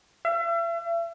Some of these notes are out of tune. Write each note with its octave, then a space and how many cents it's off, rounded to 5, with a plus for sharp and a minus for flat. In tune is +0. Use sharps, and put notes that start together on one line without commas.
E5 +40